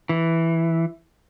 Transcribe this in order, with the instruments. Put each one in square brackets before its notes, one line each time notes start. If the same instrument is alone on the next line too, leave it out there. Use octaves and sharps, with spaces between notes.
[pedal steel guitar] E3